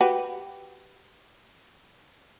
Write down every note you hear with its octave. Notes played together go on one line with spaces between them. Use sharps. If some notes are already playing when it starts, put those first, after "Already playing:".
F#4 G4 B4